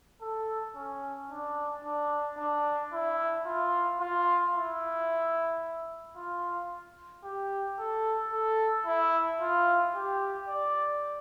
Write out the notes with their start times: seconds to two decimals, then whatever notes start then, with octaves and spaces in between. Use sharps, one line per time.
0.22 A4
0.76 C#4
1.31 D4
1.85 D4
2.38 D4
2.93 E4
3.46 F4
4.00 F4
4.55 E4
6.17 F4
7.24 G4
7.79 A4
8.33 A4
8.86 E4
9.41 F4
9.95 G4
10.48 D5